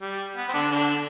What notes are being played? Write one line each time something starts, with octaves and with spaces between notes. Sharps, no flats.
G3
B3
C4
D3 D4
D3 D4